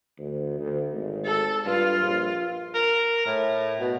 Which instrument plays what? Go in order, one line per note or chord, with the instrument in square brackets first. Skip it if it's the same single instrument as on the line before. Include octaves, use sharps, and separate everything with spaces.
[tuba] D2
D2
G#1
[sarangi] A4
[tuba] G2 [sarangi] F4
[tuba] A#1
[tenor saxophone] A#4
A2
B2